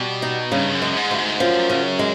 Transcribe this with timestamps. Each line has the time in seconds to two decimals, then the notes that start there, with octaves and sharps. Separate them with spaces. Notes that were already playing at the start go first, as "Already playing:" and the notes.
Already playing: B2 G3
0.22 D#4
0.52 G2 C#3
0.74 F#2
0.82 G#3
0.96 G#2
1.11 D2 G2
1.18 G#2
1.40 F#2 F3
1.70 C#3
1.99 G#3